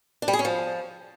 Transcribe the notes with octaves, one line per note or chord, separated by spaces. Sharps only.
D4
G3
G#4
C#4
F3